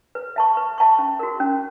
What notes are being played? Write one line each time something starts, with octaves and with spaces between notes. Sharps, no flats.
B4
E5 A5 C#6
B4
E5 A5 C#6
C#4
F#4 A#4
C#4